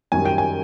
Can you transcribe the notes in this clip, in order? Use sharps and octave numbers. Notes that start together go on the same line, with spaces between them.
F#2 D#3 G3 G#5
G5
G#5